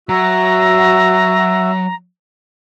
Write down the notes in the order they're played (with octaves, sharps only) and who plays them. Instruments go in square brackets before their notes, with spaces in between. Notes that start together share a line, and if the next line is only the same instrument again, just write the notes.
[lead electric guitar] F#3 [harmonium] F#4 E5 [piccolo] A#5